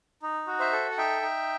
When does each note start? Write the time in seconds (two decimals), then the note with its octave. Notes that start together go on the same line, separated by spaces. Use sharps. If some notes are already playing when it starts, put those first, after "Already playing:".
0.22 D#4
0.47 F#4
0.60 C5 E5
0.72 A4
0.91 F#5
0.98 D#4 E5 G5
1.22 D#4